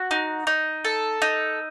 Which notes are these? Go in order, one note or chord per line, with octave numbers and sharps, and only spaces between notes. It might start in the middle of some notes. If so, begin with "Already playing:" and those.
Already playing: F#4
D#4
D#4
A4
D#4